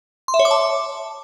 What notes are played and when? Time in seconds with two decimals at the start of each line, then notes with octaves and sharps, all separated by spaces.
0.28 C6
0.34 E5
0.39 C#5
0.45 D6
0.51 A5